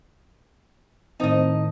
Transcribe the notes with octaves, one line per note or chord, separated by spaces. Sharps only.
A2 D#3 C4 D#4 D#5 A5